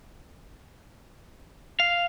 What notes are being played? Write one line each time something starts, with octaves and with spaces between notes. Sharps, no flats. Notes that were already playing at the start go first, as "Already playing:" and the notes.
F5